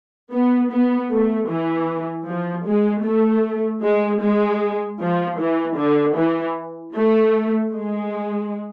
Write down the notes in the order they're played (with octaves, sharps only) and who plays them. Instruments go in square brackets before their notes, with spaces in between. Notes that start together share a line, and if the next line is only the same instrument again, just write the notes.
[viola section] B3
B3
A3
E3
F3
G#3
A3
G#3
G#3
F3
E3
D3
E3
A3
G#3